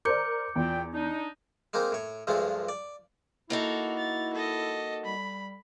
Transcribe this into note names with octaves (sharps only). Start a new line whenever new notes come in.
A#4 C5 D5 D6 G6 C#7
E2 A#2 G5
D4 D#4
G#3 A#3 C4 D#4
A2 C#5
C#2 G2 F3 G#3 A3
D5
A#3 D#4 E4 F#4 A4
A6
A4 D#5
G3 B5